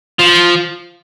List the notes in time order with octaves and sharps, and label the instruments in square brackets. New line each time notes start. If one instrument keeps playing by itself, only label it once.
[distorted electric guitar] F3